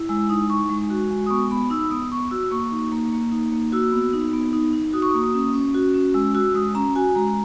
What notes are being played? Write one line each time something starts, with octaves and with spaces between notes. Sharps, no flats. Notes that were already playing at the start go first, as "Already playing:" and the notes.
Already playing: E4
G#3 E6
D#4 D#6
D#4 C#6
G#3
F#4
G#3
D#6
B3 C#6
B3 B5
D#4 E6
B3 D#6
B3 C#6
F#4 E6
A#3 C#6
D#4
A#3
A#3
D#4
A#3
F#4 E6
B3
D#4
B3
D#4
D#4
F#4 D#6
C#6
D#6
A#3
D#6
C#4
C#4
F#4
C#4
G#3 E6
F#4 E6
G#3 D#6
C#4 A#5
F#4 G#5
G#3 A#5